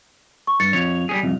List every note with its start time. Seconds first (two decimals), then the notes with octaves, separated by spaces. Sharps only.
0.47 C#6
0.60 G2 A6 C#7
0.73 F2 C#5 F7
1.09 G3 C#4 G#4
1.23 C2 F2